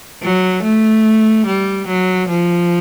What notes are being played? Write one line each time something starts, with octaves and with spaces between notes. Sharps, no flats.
F#3
A3
G3
F#3
F3